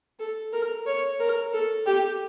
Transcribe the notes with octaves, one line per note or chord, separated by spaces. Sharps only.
A4
A#4
C#5
A#4
A4
G4